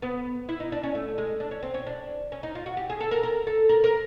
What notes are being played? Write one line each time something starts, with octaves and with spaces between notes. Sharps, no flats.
B3
E4
D#4
D4
C#4
A3
G#3
D4
C#4
C4
C#4
D4
C#4
D#4
F4
F#4
G4
G#4
A4
A#4
A#4
A4
A#4
A#4